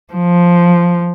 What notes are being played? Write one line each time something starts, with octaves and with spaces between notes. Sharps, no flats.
F3